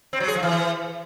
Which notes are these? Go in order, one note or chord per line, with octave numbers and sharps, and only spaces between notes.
C4
F#3
G#4
F3
E3